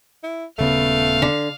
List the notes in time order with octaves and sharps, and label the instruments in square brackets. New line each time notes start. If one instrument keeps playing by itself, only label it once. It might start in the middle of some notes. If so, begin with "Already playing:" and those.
[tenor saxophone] E4
[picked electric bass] D#1 C#3 B3 [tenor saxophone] A3 [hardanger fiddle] F5
[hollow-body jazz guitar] D3